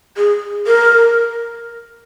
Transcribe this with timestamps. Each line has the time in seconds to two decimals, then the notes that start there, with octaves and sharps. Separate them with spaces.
0.17 G#4
0.67 A#4